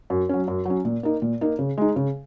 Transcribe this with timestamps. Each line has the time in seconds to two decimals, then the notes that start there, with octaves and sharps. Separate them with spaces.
0.10 F#2
0.29 F#3 C#4
0.48 F#2
0.65 F#3 C#4
0.85 A#2
1.03 A#3 D#4
1.22 A#2
1.41 A#3 D#4
1.59 C#3
1.78 G#3 D#4
1.96 C#3